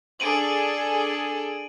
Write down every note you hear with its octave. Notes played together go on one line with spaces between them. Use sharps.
D4 G#4 A4 D7 D#7 F#7